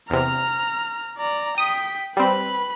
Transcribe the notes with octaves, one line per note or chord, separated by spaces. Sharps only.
E2 C3 A#5 F6
D5 A#5
G5 D#6 B6
G3 C4 B4 B5